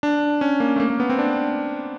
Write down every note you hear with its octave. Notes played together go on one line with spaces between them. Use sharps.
D4
C#4
A#3
A3
A#3
A#3
B3
C4
D4